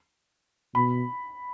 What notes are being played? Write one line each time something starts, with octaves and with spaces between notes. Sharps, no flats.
B2 B5